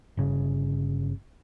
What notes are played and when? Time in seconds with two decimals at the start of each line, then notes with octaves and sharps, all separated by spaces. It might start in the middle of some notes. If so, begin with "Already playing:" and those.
0.17 G1 C#3